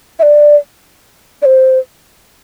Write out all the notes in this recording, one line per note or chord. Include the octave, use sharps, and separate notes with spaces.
E5
D5
D5
C5